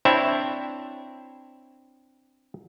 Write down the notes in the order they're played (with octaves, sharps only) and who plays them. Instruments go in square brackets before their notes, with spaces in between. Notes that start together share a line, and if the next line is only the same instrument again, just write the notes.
[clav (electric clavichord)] C4 D4 E4 C#5 E5